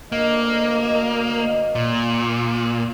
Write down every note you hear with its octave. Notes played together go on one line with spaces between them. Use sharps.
D2 A#3 D#5
A#2